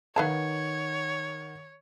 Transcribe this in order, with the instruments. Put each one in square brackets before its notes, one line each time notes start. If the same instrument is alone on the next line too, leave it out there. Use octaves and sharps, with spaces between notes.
[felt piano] D#3 F#5 G#6 [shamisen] B4 F5 A5 [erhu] C#5